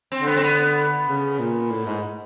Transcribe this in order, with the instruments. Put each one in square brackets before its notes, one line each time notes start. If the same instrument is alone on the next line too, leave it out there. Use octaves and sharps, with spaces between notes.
[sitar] C4
[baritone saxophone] D3
[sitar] B3
C4
B3
[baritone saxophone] C#3
A#2
A2
G#2